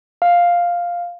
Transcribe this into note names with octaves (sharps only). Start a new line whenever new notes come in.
F5